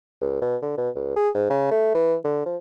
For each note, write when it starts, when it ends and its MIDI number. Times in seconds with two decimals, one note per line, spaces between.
0.21 0.38 37
0.41 0.56 47
0.62 0.76 50
0.77 0.89 47
0.95 1.12 37
1.16 1.29 68
1.34 1.45 44
1.50 1.68 49
1.71 1.92 57
1.94 2.15 52
2.24 2.41 50
2.46 2.57 53